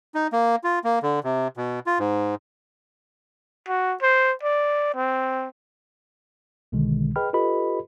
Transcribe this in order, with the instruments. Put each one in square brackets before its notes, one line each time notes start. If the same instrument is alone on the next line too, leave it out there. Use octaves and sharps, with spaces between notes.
[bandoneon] D#4
A#3
F4
A#3
D3
C3
B2
F4
G#2
[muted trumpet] F#4
C5
D5
C4
[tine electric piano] B1 B2 D3 D#3 G#3
G#4 B4 D#5 G5 B5 F6
F4 G4 A4 B4 D#5 B5